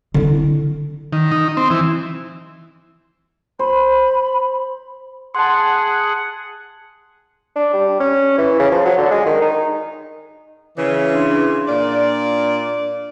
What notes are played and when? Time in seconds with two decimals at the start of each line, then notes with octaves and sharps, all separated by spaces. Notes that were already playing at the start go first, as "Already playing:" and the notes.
0.14 D3 E4
1.13 D#3
1.32 D#4
1.57 C4
1.70 E3
3.59 C5 B5
5.35 G#4 F#5 A5 C6
7.56 D4
7.73 G3
8.00 C#4
8.38 E3
8.59 C#3
8.71 F3
8.85 F#3
8.98 D3
9.11 G#3
9.26 D#3
9.42 D#4
10.77 C#3 E3
11.13 D4 C6
11.68 A#2 F4 D5